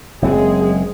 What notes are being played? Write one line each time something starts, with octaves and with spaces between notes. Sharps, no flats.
F#1 F#3 G#3 C4 G#4